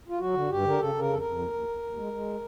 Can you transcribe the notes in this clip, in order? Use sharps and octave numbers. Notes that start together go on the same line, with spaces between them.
F4
F#3 F#4
D3
G2 G4
D3 A#4
C#3 A4
C#3 A#4
F2 A4
A#4
F2
D#2
D#2
D#2
D#2
G#3
G#3